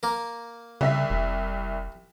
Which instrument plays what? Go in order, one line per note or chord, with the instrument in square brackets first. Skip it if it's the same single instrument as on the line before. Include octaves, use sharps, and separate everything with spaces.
[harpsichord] A#3 A#4
[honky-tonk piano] C2 E5 B6 [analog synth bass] C#3
[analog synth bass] F1